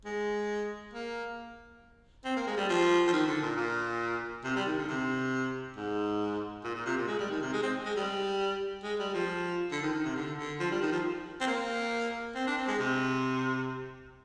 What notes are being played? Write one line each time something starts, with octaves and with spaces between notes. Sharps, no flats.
G#3
A#3
C4
A#3
G#3
G3
F3
F3
D#3
D3
A#2
A#2
C3
G3
D#3
D3
C3
G#2
A#2
A#2
C3
A#2
G#3
G3
D#3
C3
G#3
C4
G#3
G3
G#3
G3
F3
D3
D#3
D#3
C3
D3
D3
F3
G3
D#3
F3
C4
A#3
C4
D4
C4
G#3
C3